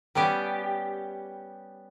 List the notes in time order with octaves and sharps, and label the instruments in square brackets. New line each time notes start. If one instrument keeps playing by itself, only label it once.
[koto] G3 B3 C#4 G4